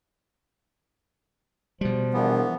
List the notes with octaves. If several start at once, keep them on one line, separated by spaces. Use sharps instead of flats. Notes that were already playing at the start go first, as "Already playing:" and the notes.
B2 F3 G3
A#1 E3 B3